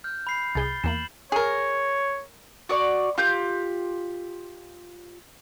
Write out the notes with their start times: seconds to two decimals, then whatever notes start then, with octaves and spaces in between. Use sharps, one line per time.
0.04 F6 G6
0.27 B5 C7
0.55 C2 G#4 A6 G7
0.84 E2 A#3 E7 F#7
1.32 G#4 A#4 C#5
2.69 F#4 D5 C#6
3.18 F4 G4 G6